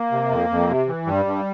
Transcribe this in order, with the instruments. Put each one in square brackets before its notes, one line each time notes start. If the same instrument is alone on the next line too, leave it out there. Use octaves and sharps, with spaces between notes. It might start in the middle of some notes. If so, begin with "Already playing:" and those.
Already playing: [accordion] A#3
C3
F2
F2
C3
E3
G2 G3
G2